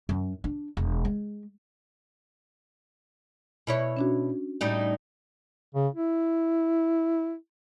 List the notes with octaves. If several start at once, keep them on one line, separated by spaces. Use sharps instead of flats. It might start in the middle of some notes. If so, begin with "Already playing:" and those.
F#2
D4
E1
G#3
B2 E4 C#5
C#4 D4 F#4
A2 G3 D#4
C#3
E4